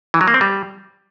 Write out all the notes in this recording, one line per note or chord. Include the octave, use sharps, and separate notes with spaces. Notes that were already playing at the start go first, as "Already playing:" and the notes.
E3
F#3
A#3
C4
G3